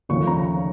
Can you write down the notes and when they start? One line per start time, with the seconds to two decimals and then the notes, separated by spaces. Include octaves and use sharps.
0.09 D#2 C#3 F3 A3 C#6
0.27 A#5